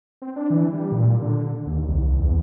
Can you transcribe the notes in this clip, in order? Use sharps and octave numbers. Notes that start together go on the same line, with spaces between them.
C4
D4
E3
G3
A#2
D3
D#2
C2
E2